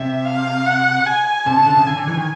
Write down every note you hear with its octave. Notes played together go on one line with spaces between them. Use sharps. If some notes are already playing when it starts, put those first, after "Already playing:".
Already playing: C3 E5
F5
F#5
G#5
C3 A5
C#3
D3
C#3
D3 G#5
D3
D3 E3
D#3